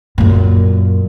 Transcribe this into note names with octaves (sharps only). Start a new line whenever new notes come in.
F#2 A#2